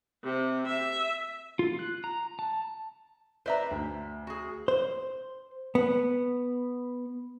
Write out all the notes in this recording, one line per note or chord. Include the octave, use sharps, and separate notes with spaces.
C3
E5
F4
F#6
A#5
A5
B4 C5 D5 E5 A#5
D2
F#4 G#4
C5
B3